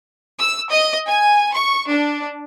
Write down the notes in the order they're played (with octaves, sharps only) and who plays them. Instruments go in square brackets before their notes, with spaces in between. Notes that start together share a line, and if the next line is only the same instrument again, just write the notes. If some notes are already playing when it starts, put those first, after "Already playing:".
[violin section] E6
D#5
G#5
C#6
D4